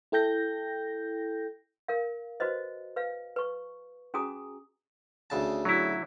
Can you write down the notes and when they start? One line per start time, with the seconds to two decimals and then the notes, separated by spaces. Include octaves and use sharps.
0.12 E4 A4 G5 G6 A#6
1.88 A#4 F5
2.40 F#4 B4 C5 D#5
2.96 B4 F5
3.36 B4 C#6
4.14 C#4 F#4 G#4 G#5 A#5 D#6
5.30 D2 C#3 A5
5.65 F#3 E4